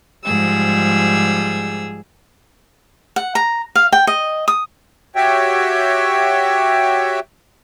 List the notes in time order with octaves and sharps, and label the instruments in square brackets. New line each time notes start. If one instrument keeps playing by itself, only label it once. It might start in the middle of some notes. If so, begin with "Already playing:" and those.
[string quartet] G#2 F3 G3 G#4 E6
[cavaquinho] F#5
A#5
F5
G5
D#5
D#6
[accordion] F#4 G4 C#5 E5 G5